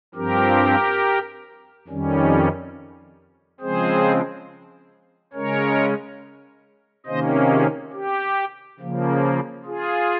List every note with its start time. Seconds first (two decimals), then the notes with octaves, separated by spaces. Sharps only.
0.15 G2 F3 C4 G4 A#4
1.88 F2 D#3 G3 C#4
3.61 C#3 F3 G#3 C4 G#4 C5
5.33 C#3 G#3 C#4 A#4 C#5
7.06 C3 D#3 A#3 C#4 C5 D#5
7.50 F4 G#4
7.93 G4
8.80 C#3 F3 A#3
9.66 F4 G#4